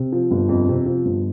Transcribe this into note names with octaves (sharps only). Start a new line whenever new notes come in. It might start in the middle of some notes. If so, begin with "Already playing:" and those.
Already playing: C3
F3
G1
F2
C3
F3
G1